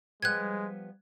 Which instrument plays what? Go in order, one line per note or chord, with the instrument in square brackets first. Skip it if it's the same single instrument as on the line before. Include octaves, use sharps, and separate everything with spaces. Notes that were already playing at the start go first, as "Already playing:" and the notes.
[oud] F3 G3 B3 [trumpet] G#3 [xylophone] F#6 G#6